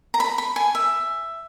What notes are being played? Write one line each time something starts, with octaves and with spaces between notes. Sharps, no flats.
A#5
B5
B5
G#5
E5